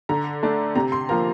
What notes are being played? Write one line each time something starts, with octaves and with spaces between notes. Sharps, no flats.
D3 A#5
A3 D4
C3 A#5
C6
F3 A#3 A#5